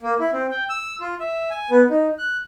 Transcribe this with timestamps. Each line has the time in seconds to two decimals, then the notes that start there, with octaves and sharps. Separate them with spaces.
0.02 A#3
0.20 E4
0.33 C4
0.51 G5
0.69 E6
1.01 F4
1.20 E5
1.50 G#5
1.70 B3
1.90 D#4
2.19 F#6